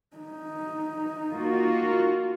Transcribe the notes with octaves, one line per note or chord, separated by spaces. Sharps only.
D#4
A#3 F4 F#4